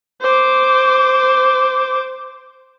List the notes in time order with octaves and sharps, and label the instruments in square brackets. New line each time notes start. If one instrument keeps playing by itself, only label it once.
[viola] C5 D6